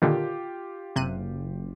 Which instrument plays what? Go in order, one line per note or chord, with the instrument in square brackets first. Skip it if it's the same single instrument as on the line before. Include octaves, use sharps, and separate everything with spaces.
[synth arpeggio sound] A#2 D3 D#3 [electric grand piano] F4 G4
[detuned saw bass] F#1 [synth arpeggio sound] C3 F#6 D#7